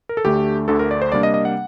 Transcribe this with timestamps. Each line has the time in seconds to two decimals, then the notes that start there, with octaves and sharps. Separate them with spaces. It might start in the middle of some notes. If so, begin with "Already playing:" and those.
0.09 A#4
0.17 A4
0.25 D2 D3 A3 D4 G4
0.68 D2 D3 A3 D4 A4
0.79 A#4
0.91 D5
1.02 C5
1.12 C3 G3 A#3 D4 D5
1.23 D#5
1.34 D#5
1.45 F#5